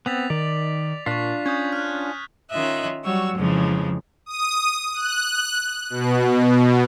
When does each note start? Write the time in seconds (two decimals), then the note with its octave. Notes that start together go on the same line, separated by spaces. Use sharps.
0.06 B3 C4 A6 B6 F7
0.30 D#3 D5
1.06 A#2 D4 F4 C#6 B6
1.46 C#4 D#6 G6 G#6
1.72 F6 F#6
2.51 D#3 C#4 F4 D#5 E5 F#6
3.05 F#3 G3 F#4 C#5 C#6 E6
3.36 F2 G#2 C#3 E3 F3
4.26 D#6
4.94 F#6
5.90 B2